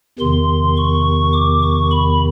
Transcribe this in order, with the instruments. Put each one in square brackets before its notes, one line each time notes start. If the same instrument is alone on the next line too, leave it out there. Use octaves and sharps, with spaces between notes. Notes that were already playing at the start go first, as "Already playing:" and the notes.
[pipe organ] E2 C3 D#3 C6
C#6
D6
C#6
B5